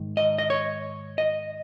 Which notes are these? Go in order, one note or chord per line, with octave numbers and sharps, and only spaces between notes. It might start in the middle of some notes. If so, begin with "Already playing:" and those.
Already playing: G#2 D#3
D#5
D#5
C#5
D#5